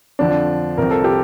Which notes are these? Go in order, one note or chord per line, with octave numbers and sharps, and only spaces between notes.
F2 D3 F3 D4
C2 C3 F3 C4 A#4
A4
G4